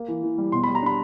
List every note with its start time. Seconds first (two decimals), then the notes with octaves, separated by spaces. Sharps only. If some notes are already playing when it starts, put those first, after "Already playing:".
Already playing: A#3
0.08 E3
0.23 E3
0.38 G3
0.52 B2 C6
0.64 G3 B5
0.75 A#5
0.82 D4 B5